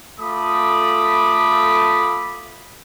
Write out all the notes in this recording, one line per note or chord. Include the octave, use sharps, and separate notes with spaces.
A3 F4 A4 B5 D6 D#6